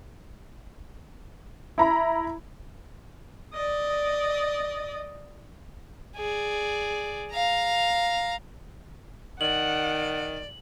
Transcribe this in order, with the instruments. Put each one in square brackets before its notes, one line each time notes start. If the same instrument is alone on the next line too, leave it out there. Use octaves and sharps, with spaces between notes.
[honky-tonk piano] E4 A#5 B5
[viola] D5 D#5
[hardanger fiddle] G#4 D5
F5 A#5
[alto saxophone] D#3 [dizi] D5 [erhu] F#5 [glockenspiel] F#7